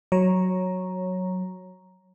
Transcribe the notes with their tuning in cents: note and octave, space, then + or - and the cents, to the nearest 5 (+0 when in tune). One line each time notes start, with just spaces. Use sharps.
F#3 +0 C#5 -10 A#5 +5